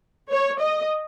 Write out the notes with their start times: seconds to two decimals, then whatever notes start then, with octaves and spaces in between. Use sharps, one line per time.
0.31 C#5
0.62 D#5